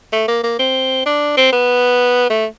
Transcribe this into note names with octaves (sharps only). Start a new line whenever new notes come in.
A3
A#3
A#3
C4
D4
C4
B3
A3